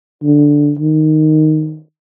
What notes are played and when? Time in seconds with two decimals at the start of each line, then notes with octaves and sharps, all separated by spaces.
0.23 D3
0.79 D#3